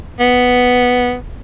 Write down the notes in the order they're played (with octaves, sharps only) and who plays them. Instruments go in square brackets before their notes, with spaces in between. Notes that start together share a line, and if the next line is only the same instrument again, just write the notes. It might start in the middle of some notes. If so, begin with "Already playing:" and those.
[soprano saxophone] B3